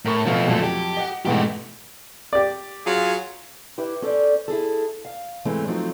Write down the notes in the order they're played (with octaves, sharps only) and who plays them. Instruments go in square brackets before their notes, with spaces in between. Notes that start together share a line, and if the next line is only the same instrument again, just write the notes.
[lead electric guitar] A2 [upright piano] A#4 C#6
[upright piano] B2 F5 [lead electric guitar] F3 A3
[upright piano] F2 F#3 [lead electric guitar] A#2 A3
[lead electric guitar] G4
[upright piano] D#5 F#5
[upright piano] E2 G#2 B2 [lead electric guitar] A3 G4
[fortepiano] G4 D5
[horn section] F#3 F4 G#4
[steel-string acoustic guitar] E4 G4 B4
C#4 A4 B4 C5 D5
E4 G#4 A4
F5
G#2 E3 G#3 A3 C4 C#4
F3 F#3 A3 C4 D#4